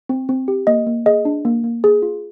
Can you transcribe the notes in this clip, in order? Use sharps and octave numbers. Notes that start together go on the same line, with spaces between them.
C4
C4
G4
A#3 D#5
A#3
G#4 D#5
D4
A#3
A#3
G#4
F4